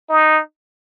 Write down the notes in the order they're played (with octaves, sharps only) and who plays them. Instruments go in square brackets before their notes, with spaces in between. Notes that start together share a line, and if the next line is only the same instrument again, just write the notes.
[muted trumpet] D#4